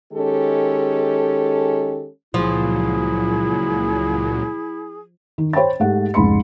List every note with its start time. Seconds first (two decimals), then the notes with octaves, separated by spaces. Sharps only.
0.13 D#3 G#3 C#4 G4 A4
2.34 C#2 A#2 F3 F#3 E4 G#4
5.38 D#3
5.53 C5 C#5 G5 B5 A6
5.80 G#2 A3 G4 F#5
6.14 F1 C#2 G#2 B5 C6 C#7